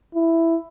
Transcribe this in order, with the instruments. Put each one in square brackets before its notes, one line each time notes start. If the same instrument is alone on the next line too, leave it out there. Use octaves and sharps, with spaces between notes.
[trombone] E4